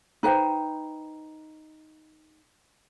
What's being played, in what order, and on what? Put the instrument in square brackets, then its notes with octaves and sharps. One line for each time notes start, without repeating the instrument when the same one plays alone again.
[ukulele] D#4 B4 C5 G5